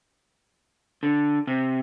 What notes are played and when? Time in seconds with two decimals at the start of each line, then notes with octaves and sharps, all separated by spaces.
1.03 D3
1.47 C3